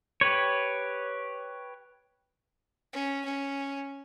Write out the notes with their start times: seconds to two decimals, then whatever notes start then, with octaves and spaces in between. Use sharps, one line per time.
0.21 G4 B4 C#5
2.93 C#4
3.25 C#4